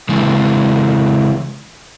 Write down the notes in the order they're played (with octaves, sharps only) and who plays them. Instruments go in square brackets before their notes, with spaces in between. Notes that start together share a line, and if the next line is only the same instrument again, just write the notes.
[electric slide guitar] C#3 E3 G#3